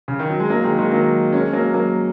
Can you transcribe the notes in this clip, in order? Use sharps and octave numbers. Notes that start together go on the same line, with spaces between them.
C#3
D#3
F#3
G#3
F#3 A#3
D#3 G#3
D#3 G#3
F#3 A#3
G#3 C#4
F#3 A#3
F#3 A#3